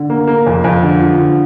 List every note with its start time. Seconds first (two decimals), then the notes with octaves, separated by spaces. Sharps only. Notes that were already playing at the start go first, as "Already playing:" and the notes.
Already playing: D3
0.10 A#3
0.27 A#3
0.46 F2
0.64 F2
0.83 D3
1.01 F3
1.20 D3